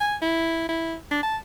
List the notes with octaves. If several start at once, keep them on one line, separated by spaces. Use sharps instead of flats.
G#5
E4
E4
D4
A5